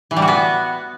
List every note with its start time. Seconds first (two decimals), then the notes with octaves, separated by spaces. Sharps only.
0.11 E3
0.16 G3
0.22 F#4
0.28 B3